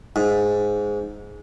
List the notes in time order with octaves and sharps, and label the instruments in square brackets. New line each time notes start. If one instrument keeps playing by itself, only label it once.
[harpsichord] G#2